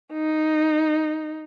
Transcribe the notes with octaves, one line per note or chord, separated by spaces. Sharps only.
D#4